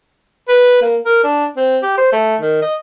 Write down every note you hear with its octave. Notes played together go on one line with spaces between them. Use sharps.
B4
A#3
A#4
D4
C4
G4
C5
A3
D#3
D#5